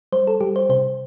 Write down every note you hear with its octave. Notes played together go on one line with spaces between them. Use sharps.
G3 C5
A4
G3 G4
C5
C3 C5